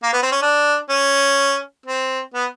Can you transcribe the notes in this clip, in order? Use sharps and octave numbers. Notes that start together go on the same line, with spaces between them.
A#3
B3
C4
C#4
D4
C#4
C4
B3